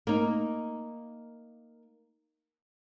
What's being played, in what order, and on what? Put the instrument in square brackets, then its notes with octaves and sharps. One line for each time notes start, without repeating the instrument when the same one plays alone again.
[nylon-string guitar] A#3 D#4